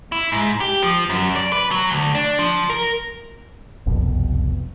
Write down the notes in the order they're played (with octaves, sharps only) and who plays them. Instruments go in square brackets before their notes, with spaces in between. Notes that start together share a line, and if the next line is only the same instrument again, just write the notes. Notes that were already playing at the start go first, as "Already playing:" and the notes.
[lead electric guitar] E4
G#2
G4
F3
F#2
D5
B4
F#3
D2
D4
F3
A#4
[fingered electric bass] F#1 C2 F2 B2